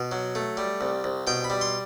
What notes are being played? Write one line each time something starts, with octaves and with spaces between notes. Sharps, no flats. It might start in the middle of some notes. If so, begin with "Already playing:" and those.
Already playing: B2
F#3
A3
G3
C2
C2
B2 G5
B5
G3
C6